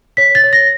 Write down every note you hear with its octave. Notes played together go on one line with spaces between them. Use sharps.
C#5 B6
A6
C#5
A#6